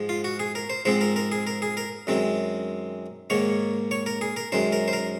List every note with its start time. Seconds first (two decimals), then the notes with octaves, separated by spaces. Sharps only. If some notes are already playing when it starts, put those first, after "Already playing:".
Already playing: G#2 F3 G#3
0.09 F4
0.24 F#4
0.39 G#4
0.55 A#4
0.70 C5
0.85 G#2 F3 G#3 C4 C5
1.01 A#4
1.16 A#4
1.32 G#4
1.47 A#4
1.62 G#4
1.77 A#4
2.07 F#2 D#3 G#3 C4
3.30 G#2 D#3 A#3 C#5
3.91 C#5
4.06 A#4
4.21 G#4
4.37 A#4
4.52 F#2 D#3 G#3 C5
4.72 A#4
4.88 C5
4.93 A#4